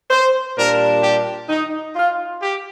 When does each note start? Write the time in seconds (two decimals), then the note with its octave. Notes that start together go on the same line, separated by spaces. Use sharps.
0.11 C5
0.57 A#2 G3 D4 A#4
1.03 G4
1.49 D#4
1.96 F4
2.42 G4